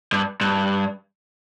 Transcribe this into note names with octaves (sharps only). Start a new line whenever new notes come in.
G2
G2